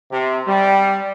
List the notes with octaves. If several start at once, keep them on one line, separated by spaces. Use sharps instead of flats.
C3
G3